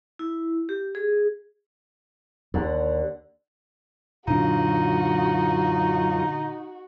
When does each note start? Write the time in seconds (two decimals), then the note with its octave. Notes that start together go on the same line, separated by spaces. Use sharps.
0.19 E4
0.69 G4
0.95 G#4
2.54 D#2 D3 F#5
4.28 F#2 A#2 D3 F3 D4 D#4 F4 F#4